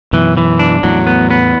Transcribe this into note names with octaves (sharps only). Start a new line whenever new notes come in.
F#2 B2 E3
E3
D4
E2 A2 F#3
B3
B3